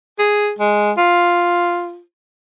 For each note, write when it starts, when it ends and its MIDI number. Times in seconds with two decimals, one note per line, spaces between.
0.19 0.52 68
0.59 0.92 56
0.97 2.01 65